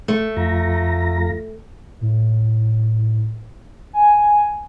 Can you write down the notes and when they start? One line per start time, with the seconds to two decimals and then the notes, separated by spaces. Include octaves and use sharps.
0.08 A3
0.37 F2 F4 A#5
2.01 A2
3.93 G#5